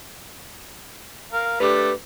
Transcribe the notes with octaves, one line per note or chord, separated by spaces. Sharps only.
A#4 F5
A3 D4 G4 B4